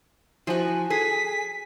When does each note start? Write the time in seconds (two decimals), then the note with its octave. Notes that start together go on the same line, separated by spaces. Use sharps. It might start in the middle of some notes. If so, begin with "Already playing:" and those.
0.47 F3 E4 F#4 C5 G#5
0.90 G#4 A4 B6